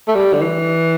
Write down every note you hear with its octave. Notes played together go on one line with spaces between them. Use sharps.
A3
G3
D3
E3